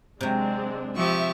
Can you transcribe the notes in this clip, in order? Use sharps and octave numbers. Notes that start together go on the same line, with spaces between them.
C3 F#3 G#3 C4 D4
F3 G4 E5 C#6